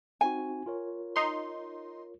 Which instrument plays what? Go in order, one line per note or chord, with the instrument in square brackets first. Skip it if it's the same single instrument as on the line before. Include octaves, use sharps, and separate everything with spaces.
[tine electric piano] C4 D#4 F#4 [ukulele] G#5
[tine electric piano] F4 A#4 C#5
[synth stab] D#4 C6